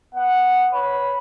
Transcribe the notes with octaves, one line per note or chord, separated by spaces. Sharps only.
B3 F#5
B4 C#5 B5